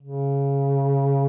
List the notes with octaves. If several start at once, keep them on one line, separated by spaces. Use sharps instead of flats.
C#3